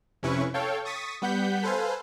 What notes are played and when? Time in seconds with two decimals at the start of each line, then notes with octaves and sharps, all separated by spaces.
0.23 F2 C3 C#4 E4 B4 C#6
0.54 A4 C#5 F5 G5
0.85 C#6 D#6 A6 B6
1.22 G3 B3 F#5 G6 B6
1.63 A4 B4 C5 F5 G#5